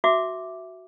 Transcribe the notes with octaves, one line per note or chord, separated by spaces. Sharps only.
F#4 E5 D6